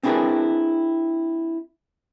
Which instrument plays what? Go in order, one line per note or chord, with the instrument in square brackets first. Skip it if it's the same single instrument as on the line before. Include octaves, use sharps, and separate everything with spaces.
[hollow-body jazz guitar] C4 D4 E4 G#4 A#4 B4